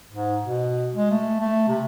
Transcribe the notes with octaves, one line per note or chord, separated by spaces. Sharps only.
G#2
B2
G#3
A3
A3
C3